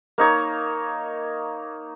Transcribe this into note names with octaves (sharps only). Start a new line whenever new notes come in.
A#3 D#4 C#5